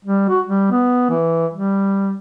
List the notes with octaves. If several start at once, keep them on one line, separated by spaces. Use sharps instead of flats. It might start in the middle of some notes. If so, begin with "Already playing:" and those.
G3
F#4
G3
B3
E3
G3